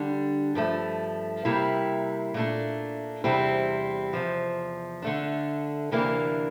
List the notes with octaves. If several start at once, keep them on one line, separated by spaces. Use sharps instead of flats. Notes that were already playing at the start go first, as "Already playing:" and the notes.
Already playing: D3 G3 D4
G2 F3 A3
C3 G3 A#3 E4
A#2 A3 D4
E2 C3 G3 C4 E4
E2 C3 F3
D3 A3 D4
D2 C3 E3 A#3 D4